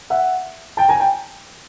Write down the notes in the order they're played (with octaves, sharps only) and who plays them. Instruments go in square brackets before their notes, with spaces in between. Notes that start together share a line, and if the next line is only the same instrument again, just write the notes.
[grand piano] E5 F#5
G5 A5
G#5 A#5
G5 A5